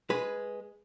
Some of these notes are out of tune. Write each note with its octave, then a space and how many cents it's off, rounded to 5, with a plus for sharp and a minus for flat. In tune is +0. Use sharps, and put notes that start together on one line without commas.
G#3 +0 B4 +0